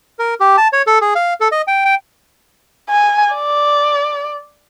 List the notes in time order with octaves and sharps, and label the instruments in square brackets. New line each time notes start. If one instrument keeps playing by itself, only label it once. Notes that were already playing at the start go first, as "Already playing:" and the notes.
[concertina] A#4
G4
A5
C#5
A4
G#4
F5
A4
D#5
G5
G5
[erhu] G#5
D5